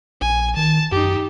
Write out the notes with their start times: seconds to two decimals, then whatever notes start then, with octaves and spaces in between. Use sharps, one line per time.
0.21 A#1 G#5
0.56 D#3 A5
0.92 F#2 D#4 G4